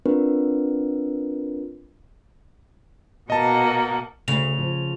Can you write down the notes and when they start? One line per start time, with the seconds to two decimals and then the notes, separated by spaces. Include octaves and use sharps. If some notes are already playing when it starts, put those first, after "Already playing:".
0.06 C4 D4 F4 A#4 B4
3.30 B2 A#3 D#5 F#5 A5
4.28 D2 C#3 A3 F7
4.59 F3